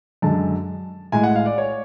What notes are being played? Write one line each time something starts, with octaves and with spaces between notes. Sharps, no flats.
F#2 D3 G#3 A5
A2 G#3 G#5
F#5
F5
D5
C#5